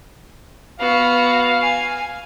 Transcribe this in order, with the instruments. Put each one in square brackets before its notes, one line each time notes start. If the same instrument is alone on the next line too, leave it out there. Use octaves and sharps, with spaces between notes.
[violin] B3 F#4 [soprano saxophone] F5
[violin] G#5